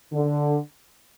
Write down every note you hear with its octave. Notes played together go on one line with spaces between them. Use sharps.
D3